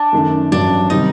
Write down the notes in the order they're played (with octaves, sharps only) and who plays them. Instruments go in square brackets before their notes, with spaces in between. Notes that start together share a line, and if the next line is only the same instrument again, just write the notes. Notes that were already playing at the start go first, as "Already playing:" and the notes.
Already playing: [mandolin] D4
[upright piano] F#2 D#3 A3
[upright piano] A1 G2 F#3 [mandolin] D4
[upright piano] C3 D#3 G3 C4 [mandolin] D#4